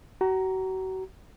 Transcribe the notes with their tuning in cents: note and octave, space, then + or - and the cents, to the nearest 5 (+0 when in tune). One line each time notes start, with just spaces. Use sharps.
F#4 +35 A#5 +0